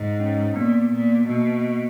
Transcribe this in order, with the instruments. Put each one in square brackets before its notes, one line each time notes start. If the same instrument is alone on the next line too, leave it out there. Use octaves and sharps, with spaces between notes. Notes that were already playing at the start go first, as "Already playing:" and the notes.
Already playing: [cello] G#2
[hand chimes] C#4
[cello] A#2 [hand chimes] B3
[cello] A#2
[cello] B2 [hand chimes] A#3